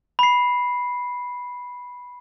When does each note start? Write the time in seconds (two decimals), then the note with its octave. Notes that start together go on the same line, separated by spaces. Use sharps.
0.19 B5 C7